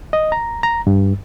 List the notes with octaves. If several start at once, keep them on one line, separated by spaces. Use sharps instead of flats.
D#5
A#5
A#5
G2